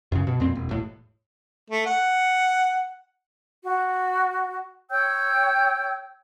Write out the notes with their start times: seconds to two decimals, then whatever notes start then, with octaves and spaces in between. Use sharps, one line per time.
0.12 F#2 C#3
0.27 B2
0.40 F2 A#2 C4
0.55 E1
0.69 E1 A2
1.70 A3
1.86 F#5
3.63 F#4
4.91 C#5 G5 E6 G6